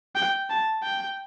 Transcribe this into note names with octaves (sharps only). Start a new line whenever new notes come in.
G5
A5
G5